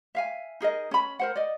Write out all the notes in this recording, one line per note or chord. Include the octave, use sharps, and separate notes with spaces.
E5 F5 G#5
D#4 G#4 A#4 D#5
C#4 B5
A#4 C5 F#5
D5 D#5